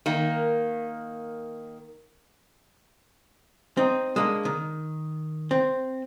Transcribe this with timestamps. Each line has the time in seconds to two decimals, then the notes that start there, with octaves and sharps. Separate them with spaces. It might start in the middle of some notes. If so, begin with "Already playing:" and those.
0.06 D#3 A#3
3.77 C4 D#4
4.16 G#3 A#3 D4
4.45 D#3
5.51 C4